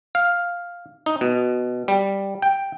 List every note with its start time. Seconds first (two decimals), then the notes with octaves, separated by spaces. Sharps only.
0.15 F5
1.06 D#4
1.21 B2
1.88 G3
2.42 G5